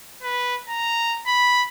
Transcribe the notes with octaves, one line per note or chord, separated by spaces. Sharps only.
B4
A#5
B5